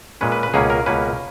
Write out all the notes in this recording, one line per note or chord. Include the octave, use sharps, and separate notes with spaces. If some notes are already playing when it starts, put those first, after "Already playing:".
A#2 G#3 C#4 B4
B4
B4
C#2 B2 A#3 C#4 G#4
A#4
C#2 B2 A#3 C#4 B4